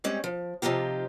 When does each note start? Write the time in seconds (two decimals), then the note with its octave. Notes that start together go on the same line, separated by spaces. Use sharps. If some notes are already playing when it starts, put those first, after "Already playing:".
0.04 G3 G#3 C4 C#4
0.24 F3
0.62 C3 F3 D#4 F4 G4